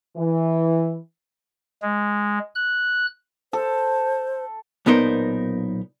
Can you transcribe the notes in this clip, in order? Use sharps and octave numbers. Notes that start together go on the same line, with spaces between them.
E3
G#3
F#6
A4 C5
B1 A#2 B3 D#4 A#4 C5